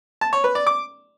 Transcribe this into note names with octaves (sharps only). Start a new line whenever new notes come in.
A5
C#5
B4
D5
D6